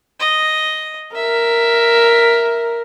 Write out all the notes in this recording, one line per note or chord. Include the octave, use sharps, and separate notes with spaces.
D#5
A#4 E5